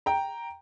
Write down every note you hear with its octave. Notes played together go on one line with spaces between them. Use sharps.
G5 A#5